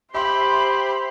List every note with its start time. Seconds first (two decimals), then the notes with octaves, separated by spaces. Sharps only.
0.15 G4 C5 E5 B5 C6